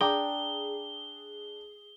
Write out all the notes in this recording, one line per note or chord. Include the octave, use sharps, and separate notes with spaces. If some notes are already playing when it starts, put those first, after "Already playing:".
D4 G#4 G5 A#5 D6 D#6 G7